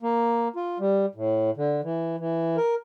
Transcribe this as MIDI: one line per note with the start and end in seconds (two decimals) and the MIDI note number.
0.02 0.48 58
0.56 0.78 65
0.79 1.06 55
1.15 1.50 45
1.57 1.81 50
1.83 2.16 52
2.19 2.57 52
2.57 2.75 70